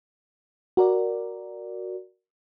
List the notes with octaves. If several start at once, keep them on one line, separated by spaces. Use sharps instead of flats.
F#4 A#4 D5